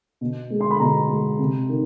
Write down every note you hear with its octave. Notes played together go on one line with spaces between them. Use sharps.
B2
G#3
C6
B5
B2 A#5
G#3
C3
D#3